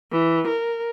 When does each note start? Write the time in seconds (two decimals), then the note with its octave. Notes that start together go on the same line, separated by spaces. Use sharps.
0.12 E3
0.48 A#4